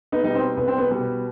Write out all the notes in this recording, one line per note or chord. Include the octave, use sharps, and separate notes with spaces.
B3 D#4
B2 G3 B3 D#4
C4
C2 B3
C4
B3
B2 G3 B3